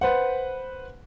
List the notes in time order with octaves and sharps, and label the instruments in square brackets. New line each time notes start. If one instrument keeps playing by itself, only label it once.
[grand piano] B4 C5 F#5